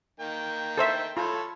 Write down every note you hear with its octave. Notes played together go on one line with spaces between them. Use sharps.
D#3 A#3 G5
A4 C5 E5
F4 A4 C#5 B5